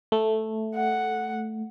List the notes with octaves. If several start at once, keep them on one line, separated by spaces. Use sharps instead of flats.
A3
F#5